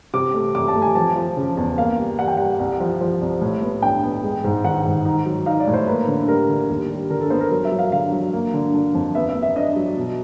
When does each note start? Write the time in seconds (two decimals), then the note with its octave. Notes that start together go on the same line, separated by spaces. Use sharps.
0.14 C3 D6
0.34 A3
0.55 C3 D6
0.68 A5
0.75 A3
0.82 G#5
0.95 F3 A5
1.16 F3
1.37 C#3
1.57 E2
1.78 A#3 F5
1.98 G3
2.19 G3 F#5
2.28 G5
2.37 G3 F#5
2.60 C2
2.80 F3
3.01 F3
3.21 C2
3.41 A2
3.62 B3
3.82 D4 G5
4.03 B3
4.23 G#3
4.44 G#2
4.64 D#3 F#5
4.85 G#2
5.05 D#4
5.26 F#3
5.46 D#4 F5
5.60 D5
5.67 A2
5.74 C5
5.87 A#3 B4
6.08 D3
6.28 G3 A#4
6.49 D3
6.69 D#2
6.90 G3
7.10 D3 A#4
7.21 A4
7.30 B3 C5
7.40 A#4
7.51 F#3 A#4
7.65 E5
7.72 F#3
7.79 F5
7.92 D3 F5
8.12 F#3
8.33 A#3
8.53 D3
8.74 D3
8.94 F2
9.15 B3 E5
9.29 E5
9.35 B3
9.43 E5
9.56 D4 D#5
9.76 F#3
9.97 B2